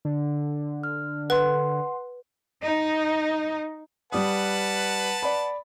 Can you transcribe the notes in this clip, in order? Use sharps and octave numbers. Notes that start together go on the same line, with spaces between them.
D3
F6
B4 F#5 C6
D#4
G3 B4 F#5 A5 D#6
D5 B5